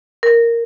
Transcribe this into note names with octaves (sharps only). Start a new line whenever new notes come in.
A#4